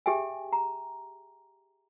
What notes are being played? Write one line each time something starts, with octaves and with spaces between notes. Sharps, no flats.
G4 G#4 E5 G5 G#5
A#5